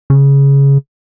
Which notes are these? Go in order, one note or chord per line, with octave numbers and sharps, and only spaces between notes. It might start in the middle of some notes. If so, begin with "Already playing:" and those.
C#3